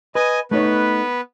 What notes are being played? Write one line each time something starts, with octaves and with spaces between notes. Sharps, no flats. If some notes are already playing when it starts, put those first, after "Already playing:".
B4 D#5 G#5
A3 B3 D#4 B4 C#5